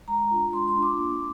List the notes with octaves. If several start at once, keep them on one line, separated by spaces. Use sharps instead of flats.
G#3 A#5
D4 F4
G#3 C6
C6
D4 F4
D6
A#3